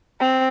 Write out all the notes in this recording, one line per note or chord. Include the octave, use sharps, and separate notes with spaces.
C4